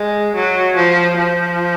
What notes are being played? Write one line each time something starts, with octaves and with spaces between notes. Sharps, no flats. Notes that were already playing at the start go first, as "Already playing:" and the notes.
Already playing: G#3
F#3
F3
F3